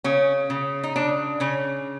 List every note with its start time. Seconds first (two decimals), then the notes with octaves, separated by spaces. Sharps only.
0.04 C#3 C#4
0.50 C#3
0.83 D#4
0.96 C#3 D4
1.40 C#3 C#4